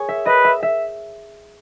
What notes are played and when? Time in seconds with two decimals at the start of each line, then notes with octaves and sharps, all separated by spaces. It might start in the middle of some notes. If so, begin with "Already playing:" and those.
Already playing: G#4 C#5
0.09 E5
0.26 B4 D#5
0.45 E5
0.63 E5